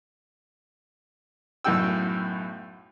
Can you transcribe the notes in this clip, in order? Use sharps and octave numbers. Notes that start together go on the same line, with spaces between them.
B1 F#2 A2 F#4 G5 E6